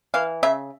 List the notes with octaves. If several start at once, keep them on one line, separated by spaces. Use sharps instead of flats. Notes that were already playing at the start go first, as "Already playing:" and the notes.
E3 F5
C#3 E5